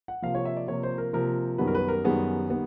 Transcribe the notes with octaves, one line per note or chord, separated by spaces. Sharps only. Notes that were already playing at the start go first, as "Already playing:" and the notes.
F#5
C3 F3 A#3 F5
C#5
E5
D5
C3 F3 A#3 C#5
C5
A#4
C3 F3 A#3 A#4
F#2 D#3 G3 B3 B4
A#4
B4
A#4
F#2 D#3 G3 B3 G#4
D#3 G3 B3